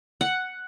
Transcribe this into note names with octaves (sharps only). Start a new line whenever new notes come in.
F#5